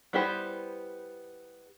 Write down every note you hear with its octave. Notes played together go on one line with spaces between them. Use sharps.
G3 B3 E4 G4 C5